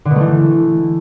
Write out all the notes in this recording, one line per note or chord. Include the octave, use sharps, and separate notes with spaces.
D3
B2
A3
E3